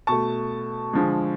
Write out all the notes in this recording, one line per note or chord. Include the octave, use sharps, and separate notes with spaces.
B2 A3 A5 C#6
D3 F3 G#3